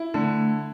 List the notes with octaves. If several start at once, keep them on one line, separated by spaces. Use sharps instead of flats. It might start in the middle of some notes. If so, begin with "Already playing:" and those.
Already playing: E4
D3 A3